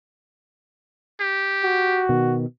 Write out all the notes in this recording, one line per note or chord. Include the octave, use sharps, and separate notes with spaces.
G4
F#4
B2 D#3